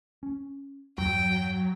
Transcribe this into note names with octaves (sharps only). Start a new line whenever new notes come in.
C#4
E2 G2 F#3 G5